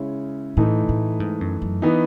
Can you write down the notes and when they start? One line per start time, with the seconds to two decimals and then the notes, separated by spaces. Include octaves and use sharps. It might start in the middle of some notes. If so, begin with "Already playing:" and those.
Already playing: C#3 G#3 C#4 E4
0.57 A2 E3 A3 D#4
0.89 A2
1.20 G#2
1.41 F#2
1.62 F#2
1.82 E3 B3 D#4